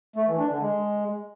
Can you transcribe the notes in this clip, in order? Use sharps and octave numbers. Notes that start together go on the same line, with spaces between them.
A3
E3
D4
D3
G#3